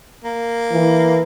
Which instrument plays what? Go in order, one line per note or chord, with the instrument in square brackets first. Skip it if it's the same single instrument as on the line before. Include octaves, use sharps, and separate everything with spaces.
[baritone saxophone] A#3
[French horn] E3